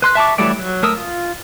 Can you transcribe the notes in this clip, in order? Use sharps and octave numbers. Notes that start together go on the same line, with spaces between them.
B4 C6 F#6
E5 A5 C#6 D6
E3 F#3 G3 A3 D5
F#3
A3 A#4 D#6 E6
F4